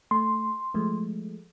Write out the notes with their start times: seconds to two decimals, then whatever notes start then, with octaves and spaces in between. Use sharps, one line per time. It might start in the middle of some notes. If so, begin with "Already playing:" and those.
0.11 A3 C6
0.74 F3 G#3 A3